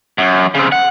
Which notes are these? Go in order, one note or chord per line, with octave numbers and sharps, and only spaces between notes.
F#2
C#3 C4
F#5